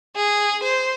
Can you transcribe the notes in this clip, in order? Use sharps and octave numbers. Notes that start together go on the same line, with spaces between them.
G#4
C5